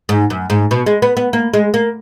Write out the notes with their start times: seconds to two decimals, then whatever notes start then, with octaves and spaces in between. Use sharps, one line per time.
0.09 G#2
0.30 F#2
0.50 G#2
0.71 B2
0.86 G#3
1.02 B3
1.17 B3
1.33 A#3
1.54 G#3
1.74 A#3